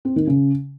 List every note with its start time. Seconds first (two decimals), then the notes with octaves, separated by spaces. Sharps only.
0.05 C4
0.16 D#3
0.27 C#3